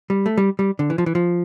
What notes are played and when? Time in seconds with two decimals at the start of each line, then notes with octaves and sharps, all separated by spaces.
0.10 G3
0.26 A3
0.38 G3
0.59 G3
0.79 D3
0.90 E3
0.98 F3
1.06 E3
1.15 F3